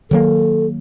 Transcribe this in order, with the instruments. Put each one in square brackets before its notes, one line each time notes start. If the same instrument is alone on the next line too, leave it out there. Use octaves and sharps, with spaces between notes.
[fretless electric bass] D#3 F#3 A#3 [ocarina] A4